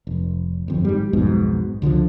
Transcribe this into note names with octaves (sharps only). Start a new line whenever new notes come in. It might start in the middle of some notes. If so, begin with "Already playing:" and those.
F1
G1 F2
G#2 G3
B1 F2 G#2 B2
C#2 D3 D#3 F3